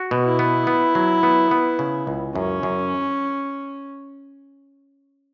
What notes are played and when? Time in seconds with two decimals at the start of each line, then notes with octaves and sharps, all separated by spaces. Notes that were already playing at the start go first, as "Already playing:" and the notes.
Already playing: F#4
0.11 B2
0.25 E4
0.39 B3
0.67 B3
0.95 F#3
1.23 B3
1.51 B3
1.79 C#3
2.07 C#2
2.35 F#2 C#4
2.63 F#2